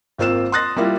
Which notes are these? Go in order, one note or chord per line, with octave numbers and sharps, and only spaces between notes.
G#1 A#3 C4 F4 E6 E7
C6 D#6 F#6 A6 A#6
G3 A#3 E4 F4